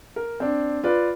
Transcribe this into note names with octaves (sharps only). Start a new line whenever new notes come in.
A#4
C4 D4
F4 B4 D5